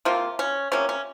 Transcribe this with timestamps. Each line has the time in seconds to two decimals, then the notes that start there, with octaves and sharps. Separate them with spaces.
0.05 C3 F3 A#3 F4
0.39 C#4
0.72 C3 F3 A#3 C#4
0.89 C#4